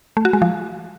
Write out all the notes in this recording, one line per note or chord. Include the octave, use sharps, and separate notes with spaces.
A3
F#4
G#3
F3